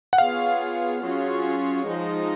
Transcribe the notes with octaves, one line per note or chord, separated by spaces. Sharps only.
F#5
B3 F4 G#4 C#5 F5
F#3 C#4 F4 G#4 C#5
F3 G#3 D#4